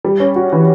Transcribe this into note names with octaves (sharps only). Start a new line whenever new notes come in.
G3
C#4
F#4
E3